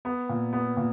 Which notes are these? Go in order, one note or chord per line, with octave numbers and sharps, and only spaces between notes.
B3
A#2
B3
A#2